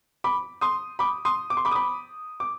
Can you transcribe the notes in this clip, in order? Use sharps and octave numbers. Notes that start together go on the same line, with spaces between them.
B5 D6
C6 D#6
B5 D6
C6 D#6
D6
C6
B5 D6
D#6
B5 D6
D6